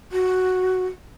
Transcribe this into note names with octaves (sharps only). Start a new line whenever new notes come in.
F#4